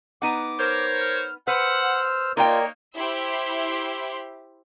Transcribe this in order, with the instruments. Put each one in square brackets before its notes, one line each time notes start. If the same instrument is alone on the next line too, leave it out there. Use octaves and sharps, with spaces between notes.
[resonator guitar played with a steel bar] B3 D#4 F#5 [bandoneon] D6
[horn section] A#4 C5 C#5
[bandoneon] F6
[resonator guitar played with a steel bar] B4 [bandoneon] C5 E6 F6 [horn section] F#5
[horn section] A#3 D#4 C#5 [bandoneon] F4 [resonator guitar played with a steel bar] A#4 D5 G5
[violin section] E4 G4 C5 E5 C6